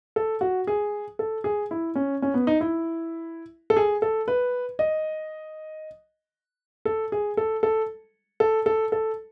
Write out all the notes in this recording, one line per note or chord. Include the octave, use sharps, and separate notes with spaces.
A4
F#4
G#4
A4
G#4
E4
C#4
C#4
B3
D#4
E4
A4
G#4
A4
B4
D#5
A4
G#4
A4
A4
A4
A4
A4